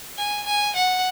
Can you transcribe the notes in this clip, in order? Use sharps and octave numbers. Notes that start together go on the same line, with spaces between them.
G#5
G#5
F#5